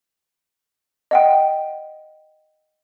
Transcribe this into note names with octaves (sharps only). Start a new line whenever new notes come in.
D#5 F#5 G5